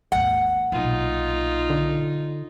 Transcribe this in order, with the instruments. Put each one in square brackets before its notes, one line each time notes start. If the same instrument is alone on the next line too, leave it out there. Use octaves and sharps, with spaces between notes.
[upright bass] G#1 D#2 [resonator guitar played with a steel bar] F#5
[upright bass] B1 A#2 [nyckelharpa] D#4 F4
[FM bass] D3